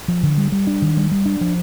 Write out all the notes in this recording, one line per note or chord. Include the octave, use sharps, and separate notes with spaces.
F3
D3
G3
G3
D4
D#3
G3
G3
D4
F3